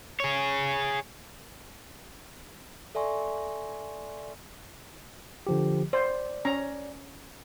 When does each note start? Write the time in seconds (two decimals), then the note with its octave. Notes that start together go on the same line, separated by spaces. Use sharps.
0.20 G#4 C#5
2.95 A4 D5 E5 G#5 C6 C#6
5.47 D3 F3 G4
5.93 C5 D5
6.45 C#4 A#5